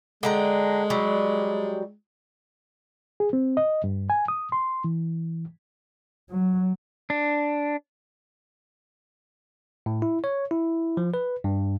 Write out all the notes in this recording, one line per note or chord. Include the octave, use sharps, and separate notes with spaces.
D3 G#3 G5 A#5
F#3 G3
G#4
C4
D#5
G2
G#5
D#6
C6
E3
F#3
D4
A2
E4
C#5
E4
F3
B4
G2